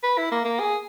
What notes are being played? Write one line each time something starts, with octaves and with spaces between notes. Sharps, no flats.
B4
E4
A#3
A#3
G#4